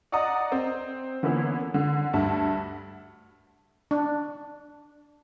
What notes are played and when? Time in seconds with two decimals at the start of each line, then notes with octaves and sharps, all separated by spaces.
0.12 D5 D#5 F#5 A#5 D#6
0.52 C4
1.23 D3 E3 A#3 B3 C#4 E4
1.74 D3
2.13 D2 G2 E5 A5
3.91 D4